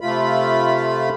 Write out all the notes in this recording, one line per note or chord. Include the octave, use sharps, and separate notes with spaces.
C3 A3 F4 B5